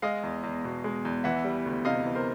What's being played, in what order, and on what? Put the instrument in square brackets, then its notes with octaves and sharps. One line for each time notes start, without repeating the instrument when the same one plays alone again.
[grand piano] G#3 D#5 F5
E2
E2
B2
G#3
E2
E3 E5 F#5
G3
D2
C3 D#5 F5
E3
A#4 C5